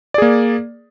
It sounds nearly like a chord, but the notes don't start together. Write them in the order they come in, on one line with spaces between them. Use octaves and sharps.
D5 G#4 A#3